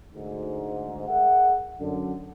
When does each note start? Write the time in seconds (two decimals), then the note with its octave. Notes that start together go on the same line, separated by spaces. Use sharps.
0.14 D2 G#2
1.08 G#4 A#4 E5 F#5
1.80 F#2 D3